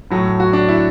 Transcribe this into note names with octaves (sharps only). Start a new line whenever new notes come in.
A2 F#3 A3
F#4
D4
E4